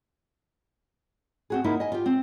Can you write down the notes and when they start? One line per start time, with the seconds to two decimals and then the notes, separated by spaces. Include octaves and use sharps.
1.50 C4 F#4 G#4
1.64 A#3 D#4 E4
1.80 D#5 G#5
1.92 F4 G4
2.06 C4